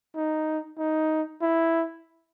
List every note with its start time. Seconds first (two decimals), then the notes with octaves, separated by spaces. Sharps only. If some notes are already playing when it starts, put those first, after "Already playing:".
0.16 D#4
0.78 D#4
1.42 E4